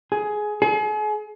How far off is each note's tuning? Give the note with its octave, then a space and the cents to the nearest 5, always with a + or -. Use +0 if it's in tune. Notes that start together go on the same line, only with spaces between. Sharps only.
G#4 +15
G#4 +40